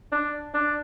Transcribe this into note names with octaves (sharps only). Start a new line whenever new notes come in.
D4
D4